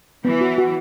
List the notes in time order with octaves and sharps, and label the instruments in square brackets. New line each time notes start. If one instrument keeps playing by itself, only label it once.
[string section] E3 [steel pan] B3
[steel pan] F#4
F#4